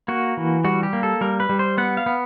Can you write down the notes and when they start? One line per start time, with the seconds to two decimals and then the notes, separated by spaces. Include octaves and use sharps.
0.08 A#3 F#4
0.37 E3
0.64 G3 F#4
0.83 G4
0.93 A#3
1.03 A4
1.21 G3 A#4
1.40 B4
1.49 G3
1.59 C5
1.78 B3 F#5
1.97 F5
2.06 B3